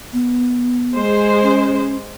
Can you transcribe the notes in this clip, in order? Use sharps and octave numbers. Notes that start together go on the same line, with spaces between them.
B3
G#3 G#4 C5
C#4